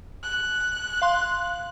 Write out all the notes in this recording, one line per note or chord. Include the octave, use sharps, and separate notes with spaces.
F#6
F5 C6